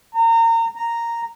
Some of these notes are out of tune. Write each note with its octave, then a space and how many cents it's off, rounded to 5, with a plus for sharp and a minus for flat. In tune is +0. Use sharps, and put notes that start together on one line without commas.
A#5 -30
A#5 -5